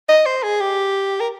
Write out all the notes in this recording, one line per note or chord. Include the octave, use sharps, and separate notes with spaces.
D#5
C5
G#4
G4
A#4